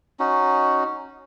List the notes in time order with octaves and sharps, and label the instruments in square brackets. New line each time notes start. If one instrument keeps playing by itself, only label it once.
[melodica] C#4 D#4 F#4